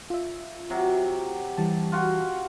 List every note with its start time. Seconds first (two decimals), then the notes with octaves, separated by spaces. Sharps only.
0.10 F4 E5
0.70 C3 F#3
1.57 E3 G3 A5
1.92 F4 F#4